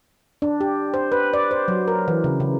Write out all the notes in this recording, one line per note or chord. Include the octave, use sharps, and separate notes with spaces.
D4
G4
C5
B4
D5
C5
F#3
A#4
E3
C#3
C#3